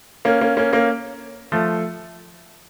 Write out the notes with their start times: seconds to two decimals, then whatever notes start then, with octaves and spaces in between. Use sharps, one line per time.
0.25 A#3 C#4
0.41 A#3 C#4
0.57 A#3 C#4
0.73 A#3 C#4
1.52 F3 A3